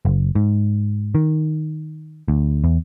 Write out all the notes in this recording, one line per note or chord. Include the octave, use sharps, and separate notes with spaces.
F#1
G#2
D#3
D2
E2